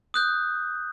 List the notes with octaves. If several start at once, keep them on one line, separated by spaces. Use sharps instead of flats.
D#6 F#6 G6